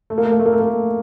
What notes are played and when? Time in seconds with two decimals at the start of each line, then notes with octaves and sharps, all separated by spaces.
0.10 A3
0.18 A#3
0.25 A3
0.32 A#3
0.39 A3
0.46 A#3
0.53 A3
0.60 A#3
0.68 A3